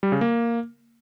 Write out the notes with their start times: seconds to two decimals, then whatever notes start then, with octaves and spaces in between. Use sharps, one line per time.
0.03 G3
0.12 C#3
0.21 A#3